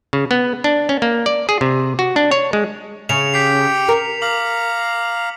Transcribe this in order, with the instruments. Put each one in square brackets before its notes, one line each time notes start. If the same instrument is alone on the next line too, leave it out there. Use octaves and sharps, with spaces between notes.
[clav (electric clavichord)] C#3
B3
D4
C#4
A#3
D5
G#4
C3
F#4
D4
C#5
G#3
[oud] C#3 [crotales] C#7 E7 F7
[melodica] G4 G5 [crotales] B6 C7
[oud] A#4
[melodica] F5 A#5 [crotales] D6 F#7